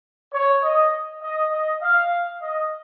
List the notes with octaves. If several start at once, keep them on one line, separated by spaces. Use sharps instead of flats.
C#5
D#5
D#5
D#5
F5
D#5